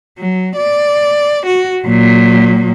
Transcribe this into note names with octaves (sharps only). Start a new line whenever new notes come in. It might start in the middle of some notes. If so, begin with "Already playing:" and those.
F#3
D5
F#4
A#2 F#3